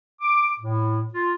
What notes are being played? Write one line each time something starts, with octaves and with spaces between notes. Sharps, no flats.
D6
A2
F4